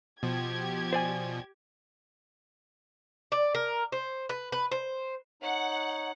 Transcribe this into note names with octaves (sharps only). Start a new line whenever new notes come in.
B2 F3 G4 G#6
C5 D5 G#5
D5
A#4
C5
B4
B4
C5
D#4 C#5 F#5